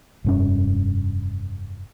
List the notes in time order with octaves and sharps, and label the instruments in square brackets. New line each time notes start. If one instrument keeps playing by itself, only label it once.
[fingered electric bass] F1 G2 C#4